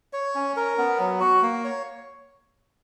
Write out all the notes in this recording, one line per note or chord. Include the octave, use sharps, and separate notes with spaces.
C#5
C#4
A#4
B3
F#3
F#4
A#3
C#5